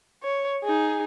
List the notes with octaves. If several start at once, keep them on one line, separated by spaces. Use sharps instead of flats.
C#5
D#4 G#4